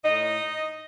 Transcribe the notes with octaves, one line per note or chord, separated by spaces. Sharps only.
A2 D#4 D#5